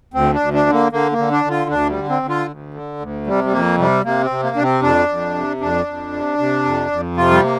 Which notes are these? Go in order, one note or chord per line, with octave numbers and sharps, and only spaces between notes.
D2 C4
D4
D2
D4
D3
A#3
D3 A#3
A#3
D3
D4
D3
F4
D2 D4
G3
D3
C4
D3
F4
D2
D3
D2
C3 G3
G3
F2 A#3
C3 G3
C3 A#3
C4
C3
A#3
C3 D4
C4
F2 D4
F2
C3
F2 D4
F2
C3
C3
F2
F2
C3 F4
G3
A#3